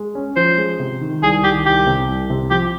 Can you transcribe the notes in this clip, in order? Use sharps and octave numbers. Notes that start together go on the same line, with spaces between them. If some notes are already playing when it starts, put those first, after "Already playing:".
Already playing: G#3
C#4
F3 C5
G#3
C3
D#3
C2 G#4
D#3 G4
C2 G4
C3
C2
C3
F3 G4